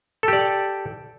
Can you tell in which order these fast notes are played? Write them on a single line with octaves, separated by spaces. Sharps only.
A4 G4 D5